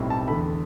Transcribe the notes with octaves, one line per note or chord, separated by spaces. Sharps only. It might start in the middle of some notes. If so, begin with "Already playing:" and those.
Already playing: B1 A2 G3 C4
A5
E2 D3 A3 B5